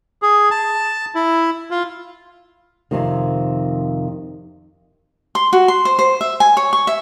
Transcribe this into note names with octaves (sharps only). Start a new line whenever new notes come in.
G#4
A5
E4
F4
F2 C3 D#3
C6
F#4
C6
C5
C5
E5
G#5
C#5
C#6
E5